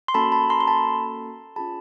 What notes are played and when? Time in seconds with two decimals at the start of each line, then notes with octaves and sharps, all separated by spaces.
0.08 C6
0.14 A#3 C#4 F#4 A4 A5 B5
0.32 A5 B5
0.50 A#5 C6
0.60 C6
0.67 A5 B5
1.56 C#4 F4 G#4 A5 B5